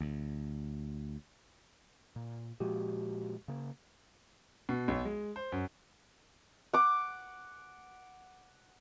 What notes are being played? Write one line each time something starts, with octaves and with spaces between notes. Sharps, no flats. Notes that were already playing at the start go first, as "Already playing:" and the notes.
D2
A#2
A#2 F3 G#3 F#4 G4
C#3 A#3
B2
B1
G#3
C5
F#2
F#5 D6